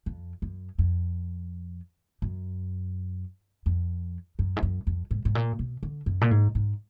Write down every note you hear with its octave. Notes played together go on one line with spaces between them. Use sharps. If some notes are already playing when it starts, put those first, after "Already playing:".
F2
F#2
F2
F#2
F2
F#2
G#2
F#2
F2
G#2
G#2
A#2
B2
D3
F#2
A#2
G#2
G#2